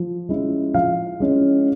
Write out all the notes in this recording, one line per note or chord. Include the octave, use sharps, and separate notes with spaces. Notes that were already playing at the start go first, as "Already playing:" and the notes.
Already playing: F3
G#3 C#4 E4
F3 F5
G#3 C#4 E4